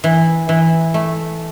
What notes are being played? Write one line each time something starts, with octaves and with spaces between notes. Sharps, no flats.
E3
E3
A3